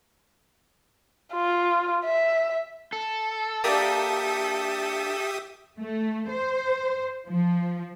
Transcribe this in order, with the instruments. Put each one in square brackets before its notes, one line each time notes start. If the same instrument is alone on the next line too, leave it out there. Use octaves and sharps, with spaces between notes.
[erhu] F4
E5
[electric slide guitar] A4
[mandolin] A#3 D4 [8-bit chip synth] G4 E5 D#6
[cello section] A3
C5
F3